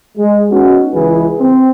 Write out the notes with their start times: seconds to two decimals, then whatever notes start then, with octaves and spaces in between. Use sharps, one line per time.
0.18 G#3
0.51 B3 C#4 D#4 F#4
0.95 C#2 E3 E4 G#4 B4
1.40 C4